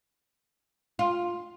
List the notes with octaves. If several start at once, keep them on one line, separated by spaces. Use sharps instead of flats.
F4